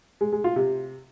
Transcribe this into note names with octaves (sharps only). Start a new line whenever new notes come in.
G#3
G#3
F4
C3